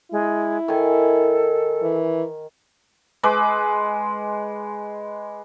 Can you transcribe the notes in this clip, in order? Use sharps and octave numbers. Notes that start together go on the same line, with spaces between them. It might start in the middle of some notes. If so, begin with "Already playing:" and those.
G#3 E4
D#3 A4 G#5
E3
G#3 B4 D6